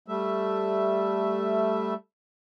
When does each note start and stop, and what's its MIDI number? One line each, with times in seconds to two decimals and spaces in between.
0.08 1.94 55
0.08 1.94 57
0.08 1.94 76